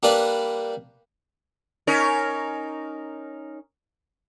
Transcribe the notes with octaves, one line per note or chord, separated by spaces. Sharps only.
G3 A#3 D4 B4 D5
C#4 D#4 A#4